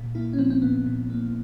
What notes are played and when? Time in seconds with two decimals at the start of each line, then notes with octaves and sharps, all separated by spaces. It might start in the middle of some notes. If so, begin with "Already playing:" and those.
Already playing: A#2
0.15 A#3 E4
0.33 C#4
0.38 F3 C4
0.50 C4
0.62 A#2 B3
0.86 A#2
1.10 A#3